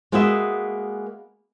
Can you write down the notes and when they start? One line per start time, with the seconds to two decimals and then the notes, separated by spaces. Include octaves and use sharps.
0.12 G#3 A#3 B3 F#4 D#5 E5